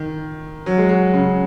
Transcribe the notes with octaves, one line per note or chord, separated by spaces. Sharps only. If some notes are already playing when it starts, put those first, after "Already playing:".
Already playing: D#3
F#3
G#3
F#3
C#3